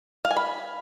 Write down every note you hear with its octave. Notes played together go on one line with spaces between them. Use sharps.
F5
G#5
B5